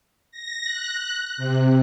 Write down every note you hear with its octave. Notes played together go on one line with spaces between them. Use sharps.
A#6
F#6
C3